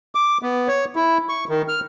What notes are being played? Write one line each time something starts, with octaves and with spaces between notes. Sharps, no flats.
D6
B3
C#5
E4
C#6
D#3
F6